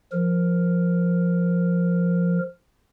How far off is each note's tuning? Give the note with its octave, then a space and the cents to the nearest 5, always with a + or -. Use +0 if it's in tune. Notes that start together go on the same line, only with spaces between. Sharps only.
F3 +0 A#4 +0